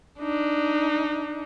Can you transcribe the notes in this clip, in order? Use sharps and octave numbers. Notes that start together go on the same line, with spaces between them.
D4 D#4